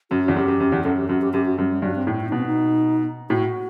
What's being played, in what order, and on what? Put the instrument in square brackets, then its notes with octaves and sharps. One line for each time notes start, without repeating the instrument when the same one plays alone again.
[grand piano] F#2 [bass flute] F#4
[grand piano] E2 [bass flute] F#4
[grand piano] F#2 [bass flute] G4
[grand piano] F#2
F#2
E2
[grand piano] F#2 [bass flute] A4
[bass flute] G4
[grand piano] F#2 [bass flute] F#4
[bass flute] G4
[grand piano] F#2 [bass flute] G4
[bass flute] F#4
[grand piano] F#2 [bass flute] G3
[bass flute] G3
[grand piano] G2 [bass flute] F#3
[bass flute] C4
[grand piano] A2
[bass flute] E4
[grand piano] B2 [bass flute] D#4
[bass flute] C4
D#4
[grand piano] A2 [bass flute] F#4